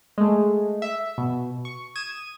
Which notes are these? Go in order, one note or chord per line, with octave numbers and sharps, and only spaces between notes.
G#3 A3
E5
B2
C#6
D#6 G#6 D#7 E7